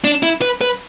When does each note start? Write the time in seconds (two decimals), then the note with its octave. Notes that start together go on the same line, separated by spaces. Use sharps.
0.04 D4
0.23 E4
0.42 B4
0.61 B4